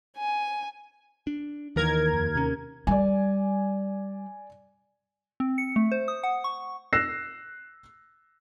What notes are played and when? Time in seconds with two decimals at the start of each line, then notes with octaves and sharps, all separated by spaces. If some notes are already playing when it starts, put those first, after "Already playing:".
0.18 G#5
1.27 D4
1.76 D#2 D#3 E3 A#4 G#6
2.13 F2
2.35 C3 C#4
2.87 G3 D5 G#5
5.40 C4
5.58 C#7
5.76 A3
5.92 C5
6.08 D#6
6.23 F#5
6.44 C#6
6.93 E6 F#6 A#6 C7 E7